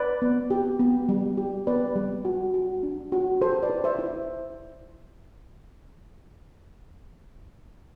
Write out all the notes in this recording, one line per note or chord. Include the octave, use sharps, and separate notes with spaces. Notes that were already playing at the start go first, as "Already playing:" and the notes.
Already playing: B4 D5
B3
G4
B3
G3
G4
B3 B4 D5
G3
F#4
F#4
D4
F#4
G4 A4 C5
B4 D5
E4
C5 E5
E4